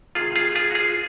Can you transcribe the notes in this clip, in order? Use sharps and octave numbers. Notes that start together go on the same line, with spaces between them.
C3 D#3 G#3 F4 G#4
F4 G#4
F4 G#4
F#4
F4 G#4